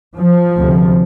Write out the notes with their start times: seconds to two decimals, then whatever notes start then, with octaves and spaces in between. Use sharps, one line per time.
0.16 F3
0.56 D2 C3